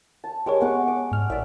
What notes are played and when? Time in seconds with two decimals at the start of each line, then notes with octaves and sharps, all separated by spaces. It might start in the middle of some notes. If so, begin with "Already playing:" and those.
0.24 A5
0.46 G#3 G4 A#4 C#5 D6
0.61 B3 G4 F#5 C#6 D6
0.88 D6
1.12 G#2 F6
1.30 A1 D5 E5